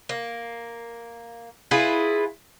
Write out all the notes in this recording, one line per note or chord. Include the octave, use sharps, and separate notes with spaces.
A#3
E4 F4 G#4 B4